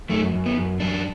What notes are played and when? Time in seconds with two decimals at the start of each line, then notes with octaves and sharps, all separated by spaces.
0.09 F#2 A3
0.34 F#2
0.46 B3
0.57 F#2
0.80 F#2 D4